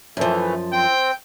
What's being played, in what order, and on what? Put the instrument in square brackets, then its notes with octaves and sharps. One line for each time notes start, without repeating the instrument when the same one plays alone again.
[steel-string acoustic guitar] F#2 F3 [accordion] E3 A3
[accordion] C4 [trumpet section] G5